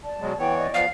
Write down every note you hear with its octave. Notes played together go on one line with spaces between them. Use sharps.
D5 A5
B2 F#3 G#3
E3 B3 C#5 G5
D5 D#5
F3 B3 F5